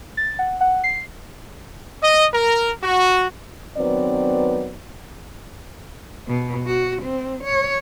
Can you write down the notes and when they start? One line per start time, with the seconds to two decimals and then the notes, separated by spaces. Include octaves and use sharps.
0.17 A6
0.39 F#5
0.61 F#5
0.84 C7
2.02 D#5
2.34 A#4
2.82 F#4
3.77 D#3 F#3 B3 C4 B4 D5
6.28 B2
6.67 F#4
7.03 C4
7.44 C#5